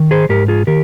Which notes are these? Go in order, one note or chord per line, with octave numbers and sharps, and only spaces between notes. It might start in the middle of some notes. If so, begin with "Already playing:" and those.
Already playing: D#3
G#4 C5
G#2 G4 A#4
F4 G#4
D#3 G4 A#4